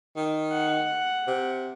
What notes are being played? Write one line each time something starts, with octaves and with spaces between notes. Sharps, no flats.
D#3
F#5
C3